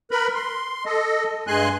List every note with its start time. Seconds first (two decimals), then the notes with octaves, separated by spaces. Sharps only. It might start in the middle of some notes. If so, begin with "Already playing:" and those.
0.11 A#4 B4 B5
0.35 C6
0.85 A4 D#5
1.47 G2 G#3 G#5 C6 F#6